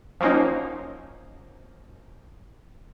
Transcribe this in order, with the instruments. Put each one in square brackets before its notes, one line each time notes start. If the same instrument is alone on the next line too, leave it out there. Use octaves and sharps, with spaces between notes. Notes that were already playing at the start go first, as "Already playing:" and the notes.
[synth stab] F3 F#3 A#3 C#4 D#4